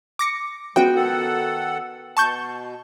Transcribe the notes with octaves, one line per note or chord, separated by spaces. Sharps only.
D6 A#6 C#7
G#3 B3 F#4 G5
D#3 A4 F#5
B2 A5 C#6 G6